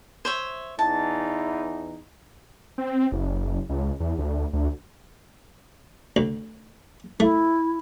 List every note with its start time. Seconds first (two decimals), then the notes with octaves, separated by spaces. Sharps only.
0.25 C5 C#5 E5
0.79 E2 E3 D#4 A5
2.78 C4
3.12 F#1
3.69 C#2
4.00 E2
4.18 D2
4.53 D2
6.16 D2
7.20 A3 E4